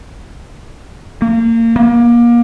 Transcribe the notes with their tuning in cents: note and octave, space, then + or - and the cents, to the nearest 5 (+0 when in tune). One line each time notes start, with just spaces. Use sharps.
A#3 -30
A#3 +30